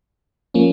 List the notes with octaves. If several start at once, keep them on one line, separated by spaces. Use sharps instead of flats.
F3 A#3 C#4